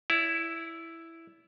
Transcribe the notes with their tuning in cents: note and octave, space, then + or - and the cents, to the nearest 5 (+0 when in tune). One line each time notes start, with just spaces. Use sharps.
E4 +0 D5 -40